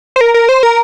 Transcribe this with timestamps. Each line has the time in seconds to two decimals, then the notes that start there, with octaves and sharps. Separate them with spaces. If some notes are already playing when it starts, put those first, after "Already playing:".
0.16 C5
0.21 A#4
0.34 A#4
0.49 C5
0.63 A#4